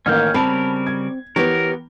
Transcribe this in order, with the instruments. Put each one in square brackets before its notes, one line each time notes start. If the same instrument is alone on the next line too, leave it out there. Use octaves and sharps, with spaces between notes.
[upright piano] A1 D#3 A#3 [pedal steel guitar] C#4 F6 G6
[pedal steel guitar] C#3 G3 A#4 [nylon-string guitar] C4 [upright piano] A5 B5
[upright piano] G#6
[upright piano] E3 [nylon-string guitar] B3 G4 C#5 [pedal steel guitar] A#4